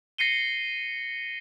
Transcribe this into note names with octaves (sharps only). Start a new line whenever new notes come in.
A#6 C7 C#7 D#7 G7